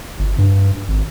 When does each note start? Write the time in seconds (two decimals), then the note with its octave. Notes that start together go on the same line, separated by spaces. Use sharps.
0.19 G1
0.38 G2
0.88 G#1